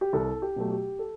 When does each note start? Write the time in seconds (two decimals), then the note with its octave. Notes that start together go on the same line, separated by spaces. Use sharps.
0.01 G4
0.13 C2 A4
0.42 G4
0.56 B2 F#3 A3
0.71 G4
0.99 A4